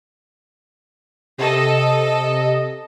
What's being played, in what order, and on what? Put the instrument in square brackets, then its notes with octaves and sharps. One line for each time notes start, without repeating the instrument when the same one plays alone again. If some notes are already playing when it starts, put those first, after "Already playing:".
[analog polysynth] C3 D#5 [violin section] A4